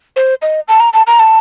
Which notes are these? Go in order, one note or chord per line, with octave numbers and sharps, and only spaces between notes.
C5
D#5
A5
A#5
A5
A#5
A5